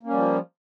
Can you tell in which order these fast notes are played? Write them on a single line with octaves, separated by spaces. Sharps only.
A#3 C#4 G3 F3